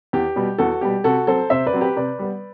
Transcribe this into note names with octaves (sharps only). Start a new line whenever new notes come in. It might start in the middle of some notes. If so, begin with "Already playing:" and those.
E2 G4
B2 G3
E2 F#4 A4
B2 G3 G4
C3 F#4 A4
F#3 C4 A4 C5
C3 C5 E5
B4 D5
F#3 C4
G4 B4
C3 B4 D5
G3 B3